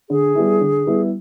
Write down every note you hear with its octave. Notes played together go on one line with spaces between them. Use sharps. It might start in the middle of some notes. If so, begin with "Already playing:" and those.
D3 G#4
G3 B3 E4
D3
G3 B3 E4